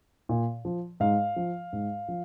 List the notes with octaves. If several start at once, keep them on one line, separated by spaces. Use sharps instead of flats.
A#2
F3
G#2 F5
F3
G#2
F3